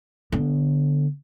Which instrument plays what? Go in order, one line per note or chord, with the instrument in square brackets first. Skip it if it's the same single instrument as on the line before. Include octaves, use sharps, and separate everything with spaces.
[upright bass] D3 B3